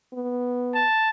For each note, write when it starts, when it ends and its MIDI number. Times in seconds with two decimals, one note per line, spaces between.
0.13 0.85 59
0.75 1.10 81